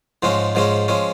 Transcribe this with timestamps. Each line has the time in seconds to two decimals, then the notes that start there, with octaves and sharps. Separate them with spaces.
0.23 G#2 F3 G#3 C#4
0.55 G#2 F3 G#3 C#4
0.88 F3 G#3 C#4